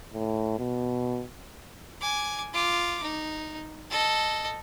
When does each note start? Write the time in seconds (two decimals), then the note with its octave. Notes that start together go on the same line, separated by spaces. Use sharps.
0.14 A2
0.58 B2
2.01 G#5 D6
2.53 F4 D6
3.03 D#4
3.90 A4 D#5